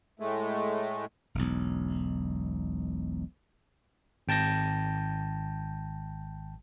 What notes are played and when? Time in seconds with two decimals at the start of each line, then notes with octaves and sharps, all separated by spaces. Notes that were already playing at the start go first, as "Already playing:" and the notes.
0.20 A2 G#3 A3
1.35 E1 B1
4.28 G#1 G5 A5 G6 A#6